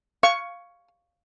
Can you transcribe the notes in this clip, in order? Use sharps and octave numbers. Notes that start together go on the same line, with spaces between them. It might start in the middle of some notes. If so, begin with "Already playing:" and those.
F5 C#6